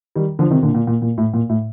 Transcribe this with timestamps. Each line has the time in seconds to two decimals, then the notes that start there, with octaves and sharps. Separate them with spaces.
0.16 D#3 G3
0.39 D3 F3
0.51 C3 D#3
0.63 A#2 D3
0.74 A#2
0.87 A#2
1.02 A#2
1.18 A2
1.34 A#2
1.49 A2